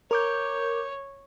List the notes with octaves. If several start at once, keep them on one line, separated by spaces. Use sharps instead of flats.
A#4 C#5 D6 G6